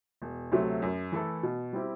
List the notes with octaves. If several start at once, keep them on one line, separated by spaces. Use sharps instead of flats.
E1
D2 C3 F#3 A3
F#2
E3 A3 E4 A4
B2
G3 C4 E4 G4